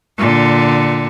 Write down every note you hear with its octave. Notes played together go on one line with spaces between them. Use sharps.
A#2 D3